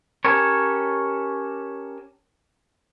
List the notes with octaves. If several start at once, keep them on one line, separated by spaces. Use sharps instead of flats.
C#4 G4 A4 A#4 C#5